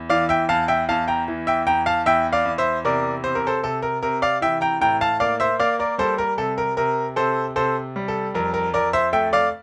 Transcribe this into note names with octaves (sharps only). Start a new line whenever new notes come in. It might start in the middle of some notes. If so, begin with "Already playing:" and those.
Already playing: E2
E3 D5 F5
E5 G5
E2 F5 A5
E5 G5
E2 F5 A5
G5 A#5
E3
E5 G5
E2 G5 A#5
F5 A5
E2 E5 G5
D5 F5
E2
C5 E5
C3 A#4 D5
C3 C5
A#4
A4 C5
C3 A4
A#4
C3 A#4
D5 F5
E3 E5 G5
G5 A#5
A2 G5 A#5
F5 A5
A#3 D5 F5
C5 E5
A#3 D5 F5
A#4 D5
G3 A4 C5
A#4
C3 A4
A#4
C3 A#4
C3 A4 C5
C3 A4 C5
G3
A4
F2 A#4
A#4
F2 A#4 D5
C5 E5
A3 E5 G5
D5 F5